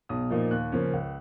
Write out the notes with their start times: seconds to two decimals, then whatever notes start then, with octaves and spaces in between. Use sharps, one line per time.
0.09 B1 D#6
0.30 A#2 F3 A#3 D#4
0.51 D#2 F#6
0.72 C#3 F3 A#3 C#4
0.93 C#2